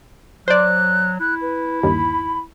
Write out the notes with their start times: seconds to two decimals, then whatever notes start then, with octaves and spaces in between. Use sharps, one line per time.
0.48 F#3 C5 D5 F#6
1.20 E4 F#6
1.42 B4
1.83 G1 D#2 B5